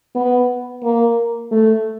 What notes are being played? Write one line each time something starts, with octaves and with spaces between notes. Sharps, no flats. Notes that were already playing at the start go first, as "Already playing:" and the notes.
B3
A#3
A3